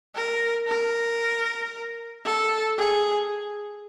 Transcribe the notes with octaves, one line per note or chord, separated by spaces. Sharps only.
A#4
A#4
A4
G#4